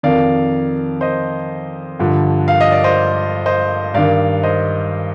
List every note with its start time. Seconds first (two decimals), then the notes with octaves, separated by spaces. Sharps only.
0.03 F2 D#3 D5 F5
1.01 C5 D#5
1.99 G2 D3 F3
2.48 F5
2.60 D#5
2.72 D5
2.84 C5 D#5
3.46 C5 D#5
3.94 G2 D#3 D5 F5
4.43 C5 D#5